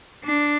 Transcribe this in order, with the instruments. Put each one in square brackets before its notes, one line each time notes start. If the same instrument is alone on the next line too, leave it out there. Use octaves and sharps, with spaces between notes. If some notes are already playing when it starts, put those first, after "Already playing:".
[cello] D4